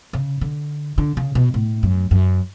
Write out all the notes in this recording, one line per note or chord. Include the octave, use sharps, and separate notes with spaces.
C#3
D3
D3
C#3
B2
A2
F#2
F#2